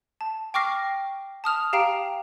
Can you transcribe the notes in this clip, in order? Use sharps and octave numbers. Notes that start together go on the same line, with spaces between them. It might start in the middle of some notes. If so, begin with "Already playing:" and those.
A5
G5 C#6 D6 F6 A#6 C7
A5 D#6 F6 F7
G4 F5 G5 A#5 C7 D7